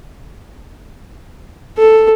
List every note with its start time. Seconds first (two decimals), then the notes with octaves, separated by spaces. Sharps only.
1.78 A4